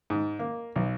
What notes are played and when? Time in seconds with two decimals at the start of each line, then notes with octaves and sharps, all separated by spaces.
0.10 G#2
0.39 A#3
0.76 B1